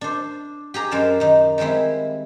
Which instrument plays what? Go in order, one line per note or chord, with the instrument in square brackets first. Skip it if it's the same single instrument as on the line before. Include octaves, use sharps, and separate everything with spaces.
[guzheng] D4 C5
G4 G#4 A#5
F#2 D#4 A#4 C5 A5
D#3 D#4
D#3 G3 G#3 C4 E4